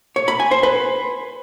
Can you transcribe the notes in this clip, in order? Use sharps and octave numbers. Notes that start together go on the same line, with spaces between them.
C#5
B5
G#5
C5
B4